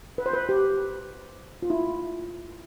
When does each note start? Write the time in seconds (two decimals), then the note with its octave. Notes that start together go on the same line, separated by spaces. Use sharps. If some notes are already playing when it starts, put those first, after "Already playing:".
0.18 B4
0.26 C5
0.33 B4
0.49 G4
1.62 F4
1.70 E4